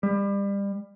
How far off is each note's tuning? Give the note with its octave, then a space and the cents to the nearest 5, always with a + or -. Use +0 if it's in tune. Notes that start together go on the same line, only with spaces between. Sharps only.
G3 +30